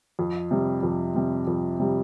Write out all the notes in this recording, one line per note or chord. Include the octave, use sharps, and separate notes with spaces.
F2
C3 G3
F2
C3 G3
F2
C3 G3